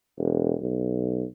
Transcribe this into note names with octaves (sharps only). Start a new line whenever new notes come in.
E1
B1